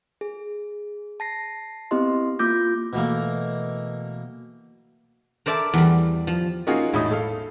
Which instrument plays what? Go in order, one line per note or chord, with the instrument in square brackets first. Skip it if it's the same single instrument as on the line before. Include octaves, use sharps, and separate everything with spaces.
[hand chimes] G#4
A5 A#6 C7
B3 C4 E4 G4 D#5 C6
A#3 F4 D6 G6 A#6
[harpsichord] B2 E3 A3 A#3
[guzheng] A#4 C5 D5 E5 A5
E2 G3
F3
[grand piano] A#3 C#4 D#4 F4 F#4 G#4
E1 A2 D#4 B5 D#6
A4 F5